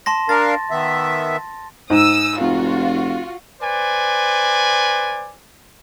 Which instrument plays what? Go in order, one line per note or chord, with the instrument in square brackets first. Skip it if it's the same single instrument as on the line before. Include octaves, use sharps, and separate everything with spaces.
[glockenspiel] A5 C6 A#6
[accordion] D4 A#4 F5 [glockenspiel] A6
[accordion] D#3 B3 E5
[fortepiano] G#2 [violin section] D#6 E6
[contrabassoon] F1 [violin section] F4 F#4
[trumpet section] B4 C5 D5 G#5